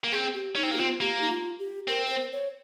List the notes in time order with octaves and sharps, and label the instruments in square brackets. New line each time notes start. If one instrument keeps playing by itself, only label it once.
[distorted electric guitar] A#3
[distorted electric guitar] C4 [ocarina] G#4
[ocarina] G4
[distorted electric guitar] C#4 [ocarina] D#4
[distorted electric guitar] C4
[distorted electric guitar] A#3 [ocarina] G4
[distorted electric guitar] C4 [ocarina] F4
[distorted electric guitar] A#3 [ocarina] G4
[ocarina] D#4
F4
G4
[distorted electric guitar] C4 [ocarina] A#4
[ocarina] A#4
C5
C#5